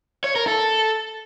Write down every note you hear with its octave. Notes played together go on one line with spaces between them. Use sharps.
C#5
A#4
A4